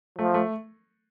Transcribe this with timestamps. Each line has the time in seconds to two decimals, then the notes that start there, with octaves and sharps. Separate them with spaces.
0.18 F3 A3
0.34 A3